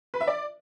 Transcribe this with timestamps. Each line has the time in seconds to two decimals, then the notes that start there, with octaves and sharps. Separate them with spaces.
0.14 B4
0.21 E5
0.27 D5